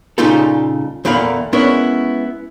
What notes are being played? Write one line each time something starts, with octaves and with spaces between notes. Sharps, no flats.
A#2 C#3 G3 D#4 F4 A4
E2 A#2 D3 A#3 F5 B5
G#3 B3 C#4 D4 E4 A#4